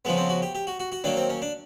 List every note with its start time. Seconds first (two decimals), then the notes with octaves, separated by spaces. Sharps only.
0.05 C#3 F3 G#3 B3
0.17 C4
0.29 F#4
0.42 G4
0.55 G4
0.67 F#4
0.80 F#4
0.92 F#4
1.04 D#3 F#3 A#3 D4
1.17 C4
1.29 C#4
1.42 D4